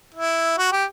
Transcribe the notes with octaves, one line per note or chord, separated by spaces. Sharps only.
E4
F#4
G4